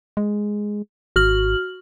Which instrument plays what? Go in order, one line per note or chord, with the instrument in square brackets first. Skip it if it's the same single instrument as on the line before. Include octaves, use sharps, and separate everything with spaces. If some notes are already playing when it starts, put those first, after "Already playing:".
[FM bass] G#3
[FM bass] G#1 [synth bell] F#4 F6 F#7